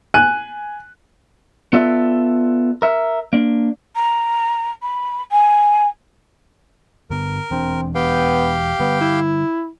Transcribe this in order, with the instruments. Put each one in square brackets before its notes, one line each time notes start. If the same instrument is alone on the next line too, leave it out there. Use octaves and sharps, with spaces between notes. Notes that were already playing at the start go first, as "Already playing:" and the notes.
[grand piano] G#5 F#6 D#7
[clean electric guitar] B3 F4 A4 D5 E5
A#4 E5
A#3 D4
[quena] A#5
B5
G#5
[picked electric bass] G2 D3 B3 [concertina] A#4
[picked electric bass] E1 E3 D4 [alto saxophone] C4
[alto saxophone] B3 [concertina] G4 F5 G5
[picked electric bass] D3 G3 [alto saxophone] B3
[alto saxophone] E4